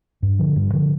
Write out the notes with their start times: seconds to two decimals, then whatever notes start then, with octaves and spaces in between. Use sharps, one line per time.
0.22 G2
0.39 D3 F3
0.56 G2
0.73 D3 F3